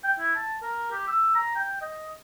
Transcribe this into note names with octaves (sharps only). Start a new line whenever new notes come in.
G5
E4
A5
A#4
G4
E6
A#5
G5
D#5